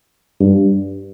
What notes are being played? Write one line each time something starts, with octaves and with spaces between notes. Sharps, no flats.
G2